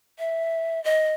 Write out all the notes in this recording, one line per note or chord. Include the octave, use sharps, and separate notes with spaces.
E5
D#5